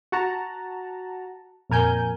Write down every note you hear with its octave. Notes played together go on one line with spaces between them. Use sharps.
F#4 F#5 A5 A#5
F2 A#2 A#4 G#5 G6